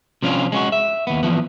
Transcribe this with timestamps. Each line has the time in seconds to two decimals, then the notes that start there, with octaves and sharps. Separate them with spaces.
0.22 C3 F3 C#4 D4 F4
0.52 G#3 C#4 F#4
0.72 E5
1.07 D#2 B3
1.23 E3 F3 B3